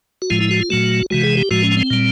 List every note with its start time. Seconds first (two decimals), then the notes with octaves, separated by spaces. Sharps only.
0.22 F#4
0.30 A2 F3 G#3 F4
0.41 E4
0.51 F#4
0.60 F4
0.70 A#2 F#3 A3 F#4
1.10 C3 E3 G#3 F#4
1.24 G#4
1.37 G4
1.51 A2 F3 G#3 F#4
1.63 C#4
1.77 C4
1.90 A#2 G3